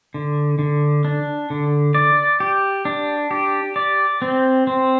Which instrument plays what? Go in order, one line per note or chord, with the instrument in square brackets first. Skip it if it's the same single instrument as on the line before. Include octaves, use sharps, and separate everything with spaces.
[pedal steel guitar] D3
D3
D4
D3
D5
G4
D4
G4
D5
C4
C4